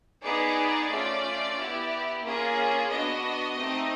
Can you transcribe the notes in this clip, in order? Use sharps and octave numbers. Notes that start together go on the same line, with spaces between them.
B3 D#4 G#4 D5
A3 C#4 F4
B3 E4 G4
A#3 C#4 F4 G#4
B3 D4 F#4 D#5
A3 C4 D#4 G4